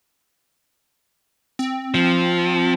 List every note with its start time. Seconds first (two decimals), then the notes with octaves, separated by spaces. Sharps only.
1.59 C4
1.94 F3